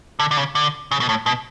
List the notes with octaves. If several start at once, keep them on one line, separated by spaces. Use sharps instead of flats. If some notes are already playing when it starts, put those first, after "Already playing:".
D3
D3
C#3
D3
C#3
B2
A2
B2